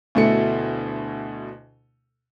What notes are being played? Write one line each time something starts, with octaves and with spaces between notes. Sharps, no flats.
D2 B2 A3 E4 C#7